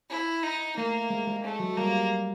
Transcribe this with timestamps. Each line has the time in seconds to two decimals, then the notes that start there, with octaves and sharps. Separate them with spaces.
0.10 E4
0.43 D#4
0.76 A3 A#3
1.10 G#3
1.27 G#3
1.43 A3
1.60 F#3
1.77 G3 A#3